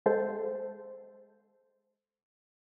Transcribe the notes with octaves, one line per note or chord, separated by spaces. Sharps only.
G#3 A4 C5